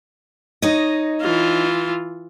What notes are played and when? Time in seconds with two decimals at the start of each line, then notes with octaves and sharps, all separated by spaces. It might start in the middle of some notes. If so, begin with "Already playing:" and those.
0.62 D#4 C#5 D#5
1.21 E3 F4